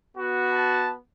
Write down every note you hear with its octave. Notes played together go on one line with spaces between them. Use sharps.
B3 F#4
A5